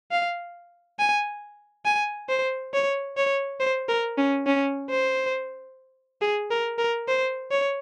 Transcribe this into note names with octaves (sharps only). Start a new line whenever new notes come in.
F5
G#5
G#5
C5
C#5
C#5
C5
A#4
C#4
C#4
C5
G#4
A#4
A#4
C5
C#5